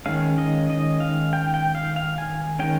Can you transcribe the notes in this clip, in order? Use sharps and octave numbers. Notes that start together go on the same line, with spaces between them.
D#3 G#3 C#4 F5
D#5
D#5
F5
G5
G5
F5
F5
G#5
D#3 G#3 C#4 G5